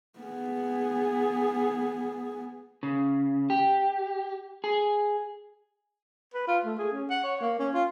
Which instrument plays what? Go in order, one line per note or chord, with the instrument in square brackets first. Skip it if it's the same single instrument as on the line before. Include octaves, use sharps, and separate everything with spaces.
[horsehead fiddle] B3 G#4
[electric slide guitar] C#3
G4
G#4
[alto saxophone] B4
F4
A3
G#4
C#4
F#5
C#5
A#3
C#4
F4